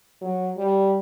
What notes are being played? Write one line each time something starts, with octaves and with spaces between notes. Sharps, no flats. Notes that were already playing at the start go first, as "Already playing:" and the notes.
F#3
G3